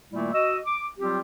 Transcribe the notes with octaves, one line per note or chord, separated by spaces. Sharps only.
A#2 D#3 G3 A3 A#3 E4
F#4 D#5 E6
D6
F#3 G3 C4 F4 G4